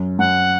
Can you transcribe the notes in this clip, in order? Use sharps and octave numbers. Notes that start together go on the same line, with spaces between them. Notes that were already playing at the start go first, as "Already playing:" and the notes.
Already playing: F#2
F#2 F#5